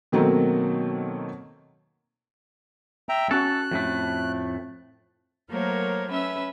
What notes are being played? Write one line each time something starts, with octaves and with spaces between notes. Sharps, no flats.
B2 D#3 F#3 A3 A#3 C4
E5 G5 A#5
C#4 F#4 A4 F#6
F2 A2 A3
F#3 A3 A#3 A#4 C5 C#5
C#4 B4 E5 E6